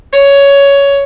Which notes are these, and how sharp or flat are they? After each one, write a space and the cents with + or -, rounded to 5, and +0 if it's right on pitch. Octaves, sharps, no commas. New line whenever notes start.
C#5 +10